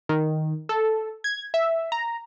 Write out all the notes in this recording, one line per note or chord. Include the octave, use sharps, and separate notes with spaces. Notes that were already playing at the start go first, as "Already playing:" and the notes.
D#3
A4
G#6
E5
A#5